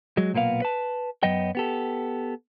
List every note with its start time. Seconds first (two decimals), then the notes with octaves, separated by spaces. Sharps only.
0.17 F#3 G#3
0.33 B1 A#2 A#3 B3 F5
0.62 B4 A5
1.23 F#2 F#3 B3 D#5 G5
1.55 B3 G4 A4